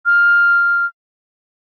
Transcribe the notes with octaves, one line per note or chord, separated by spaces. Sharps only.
F6